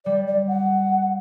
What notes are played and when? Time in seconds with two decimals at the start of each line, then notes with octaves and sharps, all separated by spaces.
0.06 G3 D5
0.27 D5
0.48 F#5